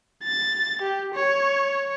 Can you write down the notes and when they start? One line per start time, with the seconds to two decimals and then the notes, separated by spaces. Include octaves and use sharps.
0.24 A6
0.82 G4
1.14 C#5